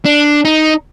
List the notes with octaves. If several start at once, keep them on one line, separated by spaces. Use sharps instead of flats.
D4
D#4